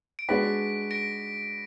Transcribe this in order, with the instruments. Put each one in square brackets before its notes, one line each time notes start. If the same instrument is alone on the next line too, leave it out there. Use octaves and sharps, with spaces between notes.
[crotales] D7
[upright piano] G#3 D4 F#4 B4 [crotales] B6
[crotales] A#6 D7